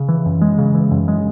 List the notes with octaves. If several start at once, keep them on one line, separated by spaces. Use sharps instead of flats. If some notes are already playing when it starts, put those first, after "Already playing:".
Already playing: C#3
E3
F#2
G#3
C#3
E3
F#2
G#3